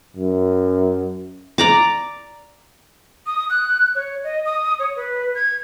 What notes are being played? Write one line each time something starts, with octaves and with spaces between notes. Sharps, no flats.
F#2
D5 A#5 D6
D#6
F#6
C#5
D#5
D#6
C#5
B4
G#6